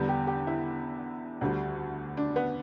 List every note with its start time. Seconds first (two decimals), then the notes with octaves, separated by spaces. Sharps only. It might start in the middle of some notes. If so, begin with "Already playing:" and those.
Already playing: E2 D3 G3
0.09 G4
0.27 G4
0.47 E4
1.41 D2 D3 G3
2.17 D4
2.36 B3